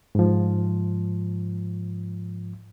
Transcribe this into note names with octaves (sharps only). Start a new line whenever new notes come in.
G#2 F3